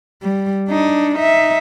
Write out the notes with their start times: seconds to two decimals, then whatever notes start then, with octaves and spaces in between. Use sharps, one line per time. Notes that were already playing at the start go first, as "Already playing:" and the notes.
0.23 G3
0.69 D4 D#4
1.15 D#4 E5